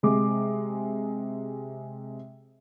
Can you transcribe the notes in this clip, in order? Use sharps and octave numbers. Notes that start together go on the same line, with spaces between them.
C3 G#3 D6